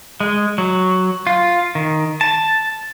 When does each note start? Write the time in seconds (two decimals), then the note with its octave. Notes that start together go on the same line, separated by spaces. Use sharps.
0.20 G#3
0.58 F#3
1.27 F4
1.75 D#3
2.21 A5